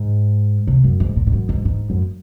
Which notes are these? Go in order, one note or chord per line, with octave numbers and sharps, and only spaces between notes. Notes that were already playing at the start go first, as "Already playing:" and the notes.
Already playing: G#2
C3
F#2
G#2
A#2
G#2
F#2
G#2
G#2
F#2